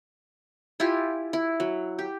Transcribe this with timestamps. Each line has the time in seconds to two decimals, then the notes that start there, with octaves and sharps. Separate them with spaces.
0.80 E4 F4 G4 G#5
1.33 E4
1.60 F#3
1.99 G4